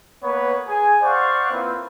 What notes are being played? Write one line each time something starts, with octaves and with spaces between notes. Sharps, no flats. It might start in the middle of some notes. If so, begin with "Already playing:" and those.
A#3 B3 B4 C#5
G#4 G#5
C5 D5 F5 F#5 C#6
A#3 C4 E4 F4 B4